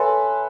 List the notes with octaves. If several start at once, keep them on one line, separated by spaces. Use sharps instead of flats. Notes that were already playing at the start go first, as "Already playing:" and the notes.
Already playing: A4 B4 C#5 E5 G#5 C6